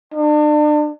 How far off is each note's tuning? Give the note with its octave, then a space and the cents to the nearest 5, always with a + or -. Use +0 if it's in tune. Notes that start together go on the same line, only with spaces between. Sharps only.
D4 +35